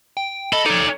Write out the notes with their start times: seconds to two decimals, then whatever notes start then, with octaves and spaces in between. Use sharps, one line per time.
0.17 G5
0.53 A4 D#5 B5
0.66 D#4 A4 C#5 D5